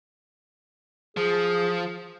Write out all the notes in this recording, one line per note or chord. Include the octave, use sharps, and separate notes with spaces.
F3 G#4